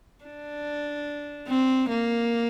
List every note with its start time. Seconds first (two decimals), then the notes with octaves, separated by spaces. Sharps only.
0.24 D4
1.48 C4
1.89 A#3